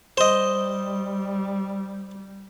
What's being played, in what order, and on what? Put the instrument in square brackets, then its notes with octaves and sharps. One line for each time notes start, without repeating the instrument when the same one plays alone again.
[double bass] G3 [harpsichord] C5 D#5